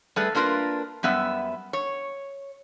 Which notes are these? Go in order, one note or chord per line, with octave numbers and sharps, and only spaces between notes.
G3 A3 G#4 B4
A#3 D4 F4 A#4 B4
F#2 G3 B3 E5
C#5